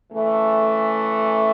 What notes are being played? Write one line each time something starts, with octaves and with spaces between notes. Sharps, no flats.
C#3 E3 A3